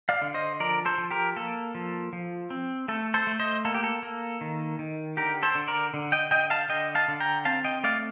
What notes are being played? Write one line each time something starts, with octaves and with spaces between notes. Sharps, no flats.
D5 F5
D3
C5 D#5
F3 A#4 D5
A4 C5
F3
G4 A#4
A#3 A4
F3
F3
C4
A3 A4
A4 C5
A3
C5 D#5
A#3 A4
G4
A4
A#3
D#3
D#3
D3 G4 A#4
A4 C5
D3
A#4 D5
D3
D#5 G5
D3 D#5 G5
F5 A5
D3 D#5 G5
F5 A5
D3
G5 A#5
C4 F5 A5
D#5 G5
A3 D5 F5